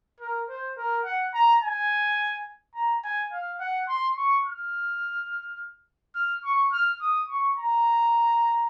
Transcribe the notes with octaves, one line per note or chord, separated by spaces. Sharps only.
A#4
C5
A#4
F#5
A#5
G#5
A#5
G#5
F5
F#5
C6
C#6
F6
F6
C#6
F6
D#6
C#6
A#5